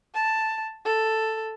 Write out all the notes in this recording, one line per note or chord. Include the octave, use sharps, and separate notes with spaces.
A5
A4